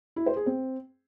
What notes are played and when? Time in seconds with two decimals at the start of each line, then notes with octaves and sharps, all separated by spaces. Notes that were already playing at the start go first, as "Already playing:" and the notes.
0.16 E4
0.26 C5
0.36 G#4
0.46 C4